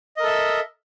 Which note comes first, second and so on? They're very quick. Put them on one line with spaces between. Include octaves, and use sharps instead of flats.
D#5 A#4 A4 E5